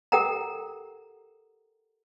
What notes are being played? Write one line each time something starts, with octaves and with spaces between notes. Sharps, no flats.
G4 A4 A#4 F#5 G5 A#5